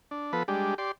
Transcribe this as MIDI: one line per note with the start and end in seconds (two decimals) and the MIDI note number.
0.11 0.33 62
0.33 0.43 53
0.33 0.43 59
0.33 0.43 69
0.33 0.43 71
0.48 0.74 55
0.48 0.74 56
0.48 0.74 62
0.48 0.74 67
0.78 0.92 67
0.78 0.92 74
0.78 0.92 84